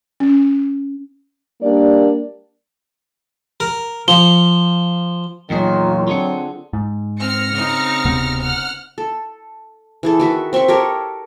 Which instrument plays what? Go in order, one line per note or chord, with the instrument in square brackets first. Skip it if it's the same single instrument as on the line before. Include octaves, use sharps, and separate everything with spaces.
[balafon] C#4
[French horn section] G3 A#3 D4 D5
[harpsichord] A#4
[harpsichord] F3 [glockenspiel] G7
[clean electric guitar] E2 A#2 G#4 [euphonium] D#3 [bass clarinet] F#3 [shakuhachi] F4
[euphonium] D3 [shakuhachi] C4 [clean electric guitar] F4 G#4 F#5
[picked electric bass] G#2
[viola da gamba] C4 [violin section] F6 A#6 C#7
[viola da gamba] C#3 C4 D#4
[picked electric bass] D1 C3 B3
[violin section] F#5 F6
[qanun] A4
E3 G#4 A4
D#3 F#4 E5
C4 E5 C6 C#6
G4 A4 A#4 C#5